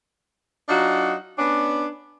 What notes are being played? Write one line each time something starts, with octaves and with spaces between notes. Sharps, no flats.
F#3 D4 D#4 F4 F#4
B3 C#4 D4